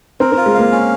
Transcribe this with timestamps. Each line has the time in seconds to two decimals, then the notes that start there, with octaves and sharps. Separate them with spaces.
0.20 C4 A#4
0.32 C4 F4
0.46 G#3
0.55 A#3 F5
0.72 C#4